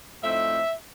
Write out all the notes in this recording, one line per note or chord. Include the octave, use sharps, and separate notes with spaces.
A2 F3 A3 C4 D#4 E5